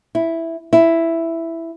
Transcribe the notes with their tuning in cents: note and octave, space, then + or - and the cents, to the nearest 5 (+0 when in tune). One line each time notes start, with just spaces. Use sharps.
E4 +0
E4 +5